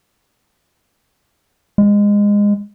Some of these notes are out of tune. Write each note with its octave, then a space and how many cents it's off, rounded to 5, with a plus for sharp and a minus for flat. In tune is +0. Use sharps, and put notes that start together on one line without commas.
G#3 -20